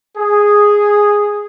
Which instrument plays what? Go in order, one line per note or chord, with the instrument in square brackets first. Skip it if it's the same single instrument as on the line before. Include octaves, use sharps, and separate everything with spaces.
[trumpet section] G#4